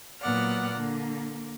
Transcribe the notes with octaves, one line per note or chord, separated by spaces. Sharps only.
A#2 F#3 B3 D5 F#5 F6
D3 A#3